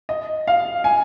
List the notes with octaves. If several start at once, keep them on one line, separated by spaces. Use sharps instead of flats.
D#5
F5
G#5